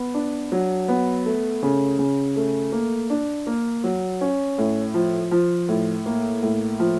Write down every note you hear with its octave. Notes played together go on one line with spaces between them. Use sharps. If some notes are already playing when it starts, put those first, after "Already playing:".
Already playing: B3
D4
F#3
B3
A3
C#3
C#3
A3
A#3
D4
A#3
F#3
C#4
A2
F3
F3
A2
A#3
A2
F3